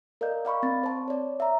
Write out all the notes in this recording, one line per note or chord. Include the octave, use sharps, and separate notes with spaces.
A#4 D5 D#5 F5 G6
D5 F5 B5 C#6
C4 A6
C5 A5
C#5 D5
E5 A#5